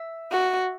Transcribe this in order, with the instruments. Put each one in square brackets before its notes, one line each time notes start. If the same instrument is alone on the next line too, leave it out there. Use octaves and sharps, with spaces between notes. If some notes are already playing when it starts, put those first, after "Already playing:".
Already playing: [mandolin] E5
[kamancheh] F#4